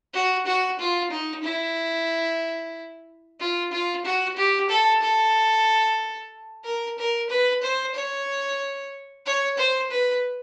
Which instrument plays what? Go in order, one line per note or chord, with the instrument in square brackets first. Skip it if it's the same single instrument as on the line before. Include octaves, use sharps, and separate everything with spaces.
[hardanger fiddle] F#4
F#4
F4
D#4
E4
F4
F4
F#4
G4
A4
A4
A#4
A#4
B4
C5
C#5
C#5
C5
B4